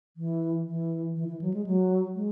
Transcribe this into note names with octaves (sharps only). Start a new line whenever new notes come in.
E3
E3
E3
E3
F#3
G#3
F#3
G#3